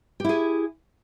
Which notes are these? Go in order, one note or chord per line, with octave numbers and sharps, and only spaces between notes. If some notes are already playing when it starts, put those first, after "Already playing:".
E4 G4 G#4